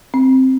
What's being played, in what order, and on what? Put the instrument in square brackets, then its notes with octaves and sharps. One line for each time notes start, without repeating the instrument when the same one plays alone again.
[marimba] C4